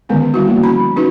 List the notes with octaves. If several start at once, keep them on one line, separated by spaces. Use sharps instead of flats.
D3 D#3 G#3 B3 C#4
G3 E4 F#4
F3 A#3
C#4 A#5 B5
C#4 D#4 E4 F#4 B4